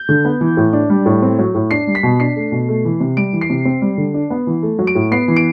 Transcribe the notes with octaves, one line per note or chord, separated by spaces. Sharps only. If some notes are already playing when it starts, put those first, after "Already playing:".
Already playing: G6
D3
B3
E3
A2
D4
G3
A2
C4
F#3
A2
D4 C7
G3
B6
B2
D4 C7
A3
B2
A3
E3
C3
G3 D7
E3
C7
C3
C4
G3
D3
D4
B3
E3
A3
F#3
D7
A2
B3 C7
E3
D7